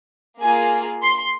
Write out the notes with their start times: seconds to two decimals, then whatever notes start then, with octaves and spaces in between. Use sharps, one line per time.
0.41 A#3 F4 G#4 G#5
1.03 C6